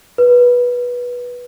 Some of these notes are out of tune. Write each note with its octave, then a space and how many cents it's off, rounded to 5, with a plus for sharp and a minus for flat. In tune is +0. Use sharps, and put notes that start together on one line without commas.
B4 -15